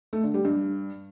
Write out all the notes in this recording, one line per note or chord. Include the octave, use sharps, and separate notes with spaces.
A3
D3
G3
G2